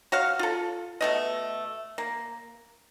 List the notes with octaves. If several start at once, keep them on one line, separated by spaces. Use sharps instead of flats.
F#4 C#5 F5
F4 A4
B2 A3 D#5
A#3